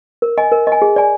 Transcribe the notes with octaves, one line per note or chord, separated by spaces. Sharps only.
A#4
D#5 G#5
A#4
D#5 G#5
G#4
D5 G#5